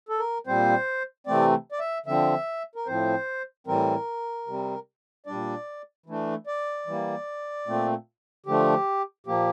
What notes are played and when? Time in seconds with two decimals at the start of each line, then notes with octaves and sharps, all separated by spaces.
0.09 A4
0.20 A#4
0.47 A#2 G3 C4 C5
1.27 C3 E3 A3 C4 D5
1.72 D5
1.80 E5
2.06 D3 F3 C4 E5
2.75 A#4
2.86 A2 F3 C4 C5
3.67 A2 E3 G3 C4 A#4
4.47 C3 G3 C4
5.26 A#2 G3 D4 D5
6.06 E3 A3 D4
6.47 D5
6.87 E3 G3 A#3
7.67 A#2 A3 C4
8.46 D3 F3 A3 G4
9.26 A#2 F3 A#3 G4